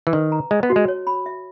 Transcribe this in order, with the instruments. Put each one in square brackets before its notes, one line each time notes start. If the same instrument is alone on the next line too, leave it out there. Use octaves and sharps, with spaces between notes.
[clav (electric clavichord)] E3
[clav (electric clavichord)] D#3 [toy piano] B4
[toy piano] A#5
[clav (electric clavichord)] G#3 [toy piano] D#5
[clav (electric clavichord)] B3
[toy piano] F#4
[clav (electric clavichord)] G#3
[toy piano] C#5
B5
E5